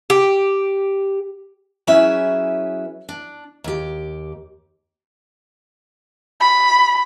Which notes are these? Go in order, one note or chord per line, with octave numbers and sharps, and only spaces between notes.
G4
F#3 C#4 E4 G#4 B4 E5
D4
D#2 G4
B5